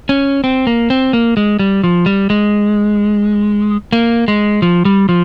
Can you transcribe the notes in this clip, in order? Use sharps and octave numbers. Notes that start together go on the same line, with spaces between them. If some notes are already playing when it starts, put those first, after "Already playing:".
C#4
C4
A#3
C4
A#3
G#3
G3
F3
G3
G#3
A#3
G#3
F3
G3
F3